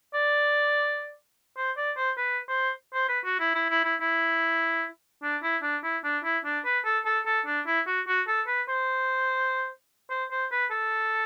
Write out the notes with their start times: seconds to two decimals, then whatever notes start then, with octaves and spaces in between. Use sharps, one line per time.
0.14 D5
1.57 C5
1.77 D5
1.97 C5
2.18 B4
2.49 C5
2.94 C5
3.09 B4
3.24 F#4
3.40 E4
3.55 E4
3.70 E4
3.85 E4
4.01 E4
5.23 D4
5.43 E4
5.63 D4
5.83 E4
6.04 D4
6.24 E4
6.45 D4
6.65 B4
6.85 A4
7.06 A4
7.26 A4
7.46 D4
7.66 E4
7.87 F#4
8.07 F#4
8.27 A4
8.47 B4
8.68 C5
10.10 C5
10.31 C5
10.52 B4
10.71 A4